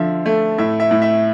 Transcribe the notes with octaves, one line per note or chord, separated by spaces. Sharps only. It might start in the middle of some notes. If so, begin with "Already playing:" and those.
Already playing: D3 F3 E5
A3
A2 E5
E5
A2
E5